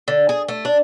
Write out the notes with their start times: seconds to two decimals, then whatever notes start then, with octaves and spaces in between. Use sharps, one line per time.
0.08 D3
0.29 G#4
0.49 A3
0.65 D4